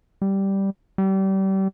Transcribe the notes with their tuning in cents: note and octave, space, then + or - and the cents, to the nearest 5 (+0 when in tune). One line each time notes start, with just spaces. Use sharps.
G3 -5
G3 -30